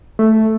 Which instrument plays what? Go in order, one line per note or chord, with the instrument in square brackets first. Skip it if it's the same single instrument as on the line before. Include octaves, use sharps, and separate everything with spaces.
[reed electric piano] A3